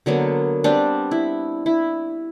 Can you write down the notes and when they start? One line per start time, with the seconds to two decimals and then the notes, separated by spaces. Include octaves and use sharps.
0.06 D3 F#3 A#3 B3
0.64 G3 B3 C4 D4
1.11 E4
1.66 E4